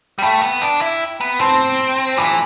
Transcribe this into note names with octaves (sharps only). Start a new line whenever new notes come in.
G3
A3 G5 B5
B3
D4
E4
B3
C4 A5 C6
E3 B5 D6